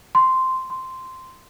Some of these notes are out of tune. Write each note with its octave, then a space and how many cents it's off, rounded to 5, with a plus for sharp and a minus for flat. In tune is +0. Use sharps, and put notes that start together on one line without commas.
C6 -5
C6 -5